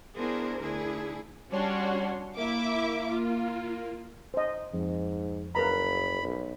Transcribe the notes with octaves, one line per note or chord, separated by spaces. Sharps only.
B3 D4 E4 G#4 A#4 C5
D2 D4 E4 G#4
G3 C#4 D4 F#4 C#5 C6
A#3 E4 E5 D6
F4
C5 D#5
F2 G#2
F#1 A#4 B4 A#5 B5
B1